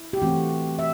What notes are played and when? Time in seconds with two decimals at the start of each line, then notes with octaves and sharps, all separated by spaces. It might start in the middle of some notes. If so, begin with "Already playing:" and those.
Already playing: E4
0.13 G4
0.22 E3 A3 C4 F#4
0.79 E5